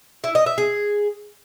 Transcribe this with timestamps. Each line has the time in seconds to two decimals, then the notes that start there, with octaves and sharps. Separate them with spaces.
0.24 E4
0.35 D#5
0.46 E5
0.58 G#4